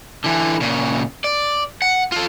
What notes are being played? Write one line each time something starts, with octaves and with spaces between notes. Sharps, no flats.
D3 E3
A#2 C#3
D5
F#5
F4 A4